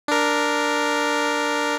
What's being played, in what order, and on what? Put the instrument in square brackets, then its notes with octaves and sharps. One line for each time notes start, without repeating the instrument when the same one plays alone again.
[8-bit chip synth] D4 A#4